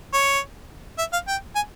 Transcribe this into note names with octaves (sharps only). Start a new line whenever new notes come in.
C#5
E5
F5
G5
G#5